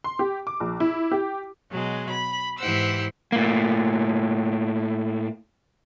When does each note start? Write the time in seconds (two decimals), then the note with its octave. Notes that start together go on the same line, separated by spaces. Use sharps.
0.04 C6
0.19 G4
0.47 D6
0.60 A#1
0.80 E4
1.12 G4
1.69 B2 F#3 G#3
2.09 B5
2.58 G#2 E3 G4 C5 F#5 E6
3.32 A2 A#3